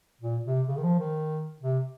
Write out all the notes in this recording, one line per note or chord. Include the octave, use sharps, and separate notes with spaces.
A#2
C3
C#3
D#3
F3
D#3
C3